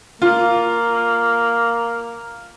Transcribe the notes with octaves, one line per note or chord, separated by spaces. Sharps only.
A#3 F4